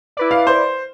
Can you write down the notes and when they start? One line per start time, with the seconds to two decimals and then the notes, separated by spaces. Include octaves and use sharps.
0.17 E4 B4 D5
0.31 F5
0.47 C5